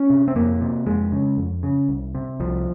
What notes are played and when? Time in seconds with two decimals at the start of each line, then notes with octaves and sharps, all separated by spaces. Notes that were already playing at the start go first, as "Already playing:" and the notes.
Already playing: C#4
0.10 C3
0.28 C4
0.35 F2 A#3
0.61 C3
0.86 F2 G#3
1.12 C#3
1.37 F2
1.63 C#3
1.89 C2
2.15 C3
2.40 C2 F3